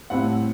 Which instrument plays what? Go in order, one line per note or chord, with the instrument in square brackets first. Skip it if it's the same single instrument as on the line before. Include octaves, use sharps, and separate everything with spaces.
[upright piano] A2 G3 C4 E4 F#5